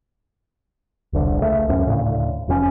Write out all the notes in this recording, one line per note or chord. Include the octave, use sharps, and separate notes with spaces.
E1 C2 D3
C#2 A3
D1 F#2 C#4
D2 A2 C#3
F1 F2 C#3 C#4